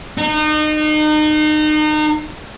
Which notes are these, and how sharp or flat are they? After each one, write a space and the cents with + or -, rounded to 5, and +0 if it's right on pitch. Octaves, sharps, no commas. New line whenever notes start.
D#4 -30